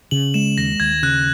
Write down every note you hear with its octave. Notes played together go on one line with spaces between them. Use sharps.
C#3 F#7
G#3 E7
D#2 A#6
D#2 G#6
C#3 F#6